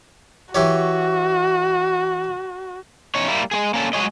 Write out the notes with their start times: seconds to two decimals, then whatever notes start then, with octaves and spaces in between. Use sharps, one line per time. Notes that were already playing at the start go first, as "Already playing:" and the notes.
0.55 E3 F#4 G4 C#5
3.15 E2 C#4 D#4 C#5
3.28 G3 A#3 E4
3.51 G#3 A#3 G#4
3.74 A#3 C#4 D4 A4
3.93 F#3 G#3 G4 G#4 C#5 D#5